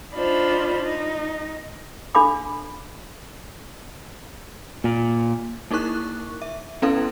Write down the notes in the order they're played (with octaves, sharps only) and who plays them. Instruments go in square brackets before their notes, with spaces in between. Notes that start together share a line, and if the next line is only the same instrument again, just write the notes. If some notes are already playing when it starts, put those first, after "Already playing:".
[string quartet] D4 D#4 F4 C5 B5
D#4
[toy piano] D4 A4 F5 B5 D6
[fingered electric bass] A#2
[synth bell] A#3 D#4 E4 A#4 C#6 F#6
E5
B3 C#4 E4 A4 B4 F5